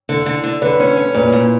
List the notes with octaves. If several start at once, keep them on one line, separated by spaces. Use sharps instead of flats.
D3
D3
D3
D3 B4 D5
C#4
C#4
A#2 B4 D5
A#2